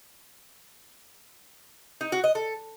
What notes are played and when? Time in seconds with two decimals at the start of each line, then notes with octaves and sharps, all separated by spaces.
2.01 D#4
2.12 F#4
2.24 D#5
2.35 A4